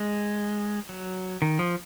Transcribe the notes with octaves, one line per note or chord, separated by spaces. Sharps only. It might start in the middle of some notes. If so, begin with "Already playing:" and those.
Already playing: G#3
F#3
D#3
F3